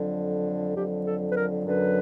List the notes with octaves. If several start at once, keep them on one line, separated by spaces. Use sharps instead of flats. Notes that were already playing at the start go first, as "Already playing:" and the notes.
Already playing: F2 D3 F#3
F2 D3 F#3 G4
A4
B4
A#4
F#2 D3 F#3 B4